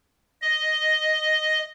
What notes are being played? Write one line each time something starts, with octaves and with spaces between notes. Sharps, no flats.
D#5